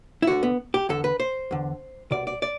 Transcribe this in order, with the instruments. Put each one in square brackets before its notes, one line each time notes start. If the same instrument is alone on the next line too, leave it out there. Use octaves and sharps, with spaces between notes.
[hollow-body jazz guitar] E4
D2 D3 F#4
B3
G4
E2 D3 A4
B4
C5
E2 D3
C2 B2 D5
D5
D5